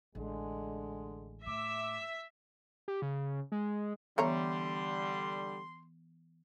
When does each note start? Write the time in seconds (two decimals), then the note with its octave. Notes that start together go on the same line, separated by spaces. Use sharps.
0.15 A1 D3 G#3
1.46 A2 E5 D6
2.88 G4
3.02 C#3
3.52 G#3
4.18 D3 E3 G3 A3 B3 C#5 A#5 C6